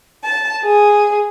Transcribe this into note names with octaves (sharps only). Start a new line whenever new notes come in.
A5
G#4